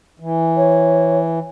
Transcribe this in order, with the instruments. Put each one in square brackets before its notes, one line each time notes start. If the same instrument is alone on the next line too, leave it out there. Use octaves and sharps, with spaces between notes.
[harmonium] E3
[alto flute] C#5